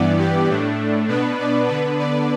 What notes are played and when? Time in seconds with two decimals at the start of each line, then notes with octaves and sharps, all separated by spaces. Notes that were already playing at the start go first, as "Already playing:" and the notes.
Already playing: G2 E3 B3 D5
0.18 G4
0.48 A2 A3 D4
1.08 B2 B3 D4 B4
1.38 D5
1.68 D3 B3 D4 B4
1.98 D5